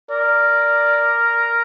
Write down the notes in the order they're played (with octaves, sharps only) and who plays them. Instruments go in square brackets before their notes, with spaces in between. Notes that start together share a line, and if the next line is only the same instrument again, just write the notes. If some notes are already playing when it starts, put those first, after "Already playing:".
[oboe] A#4 [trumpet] D5